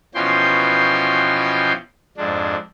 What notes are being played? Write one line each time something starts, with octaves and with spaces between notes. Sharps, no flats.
B2 E3 F3 C#4 G5 C6
F2 G#2 D4